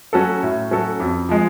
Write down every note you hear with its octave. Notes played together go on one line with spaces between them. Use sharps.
F#3 C#4 F#4 A4
A2
F#3 C#4 F#4 A4
F2
F3 G#3